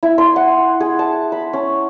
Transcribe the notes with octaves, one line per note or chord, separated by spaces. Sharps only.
E4
C6
F#5
G#4
A5
B5
C#4